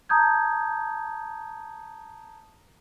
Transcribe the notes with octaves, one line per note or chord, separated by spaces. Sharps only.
A5 A#5 D#6 G6 G#6